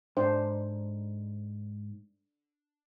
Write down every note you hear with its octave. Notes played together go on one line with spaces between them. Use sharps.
G#2 D4 C5